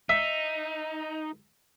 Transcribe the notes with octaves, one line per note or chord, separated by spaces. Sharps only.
D#4 E5